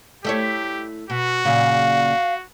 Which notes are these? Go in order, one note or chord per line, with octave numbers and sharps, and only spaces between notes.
A3 E4 G4 C#5
B2 F#4
F#2 A#2 C#3 F5